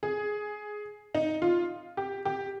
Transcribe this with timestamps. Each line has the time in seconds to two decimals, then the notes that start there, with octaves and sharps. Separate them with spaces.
0.03 G#4
1.15 D#4
1.42 F4
1.97 G4
2.25 G4